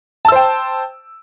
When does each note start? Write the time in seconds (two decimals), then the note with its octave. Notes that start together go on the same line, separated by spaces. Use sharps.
0.25 A5
0.28 E6
0.32 C5
0.36 G5